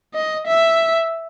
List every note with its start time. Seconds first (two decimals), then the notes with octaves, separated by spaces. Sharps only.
0.15 D#5
0.47 E5